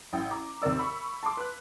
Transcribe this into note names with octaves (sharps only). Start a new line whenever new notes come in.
A1 G5
A#5 D6
D#2 C3 A#4 D5 E6
B5 C#6
A5 C6 D6
B4 F#6